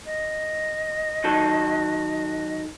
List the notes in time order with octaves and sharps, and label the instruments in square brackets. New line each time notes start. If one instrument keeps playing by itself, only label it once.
[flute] D#5
[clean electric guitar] D#3 F#3 A4